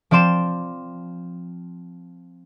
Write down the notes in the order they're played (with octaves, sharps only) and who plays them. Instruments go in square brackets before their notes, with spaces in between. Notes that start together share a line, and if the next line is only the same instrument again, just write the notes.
[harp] F3 C4 D5 C6 E7